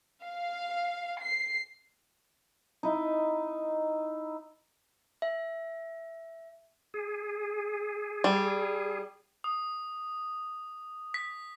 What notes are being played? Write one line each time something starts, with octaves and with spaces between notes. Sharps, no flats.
F5
C7
D#4 E4
E5
G#4
G3
D#6
B6